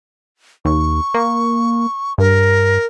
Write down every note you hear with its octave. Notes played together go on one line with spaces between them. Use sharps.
D#2 C#6
A#3
G2 A#4